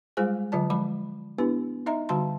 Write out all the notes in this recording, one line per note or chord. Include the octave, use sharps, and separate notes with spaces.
G3 G#3 F4 G#4 C5 G#5
D3 F#3 F4 D5 A5
F3 G#3 B5
B3 D4 E4 G4 B4
D#4 D#5 E5 A#5
D3 G3 F#4 A5 C6